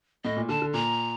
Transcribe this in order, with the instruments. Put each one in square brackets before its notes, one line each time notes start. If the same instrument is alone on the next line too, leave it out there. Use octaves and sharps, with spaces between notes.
[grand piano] A2 [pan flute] D#5
[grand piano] A#2
[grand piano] D3 [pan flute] A5
[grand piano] D3
[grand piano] A#2 [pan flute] A#5